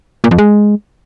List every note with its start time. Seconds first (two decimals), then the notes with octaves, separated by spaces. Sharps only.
0.24 A#2
0.31 F2
0.38 G#3